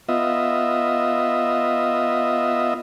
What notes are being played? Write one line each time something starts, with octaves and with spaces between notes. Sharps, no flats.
B3 F4 D#5 E5